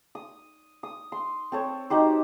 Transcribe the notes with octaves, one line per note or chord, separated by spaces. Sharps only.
D#6
D#6
C6
C4 A4 C#5
D#4 F#4 G4 C5